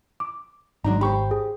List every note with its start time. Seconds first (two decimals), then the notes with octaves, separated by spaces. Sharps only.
0.20 D6
0.84 G#1 G#2 F#3 G#3 D4 D#4 A#5
1.01 G4 C5 B5 C#6
1.31 G#4